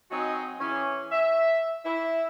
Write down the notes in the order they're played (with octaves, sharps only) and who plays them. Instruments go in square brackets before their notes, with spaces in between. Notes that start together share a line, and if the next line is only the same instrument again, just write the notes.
[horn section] F#3 C4 D#4 F#4 D#5 G#5
E3 C#4 G#4
E5
E4 E5